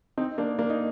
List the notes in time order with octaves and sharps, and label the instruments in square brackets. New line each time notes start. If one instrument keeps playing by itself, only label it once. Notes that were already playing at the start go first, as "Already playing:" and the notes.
[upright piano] C4 D#4
A#3 D4
A#3 D4
D#4